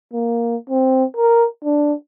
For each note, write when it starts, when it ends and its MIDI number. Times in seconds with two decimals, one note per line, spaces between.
0.13 0.56 58
0.70 1.04 60
1.17 1.46 70
1.64 1.93 62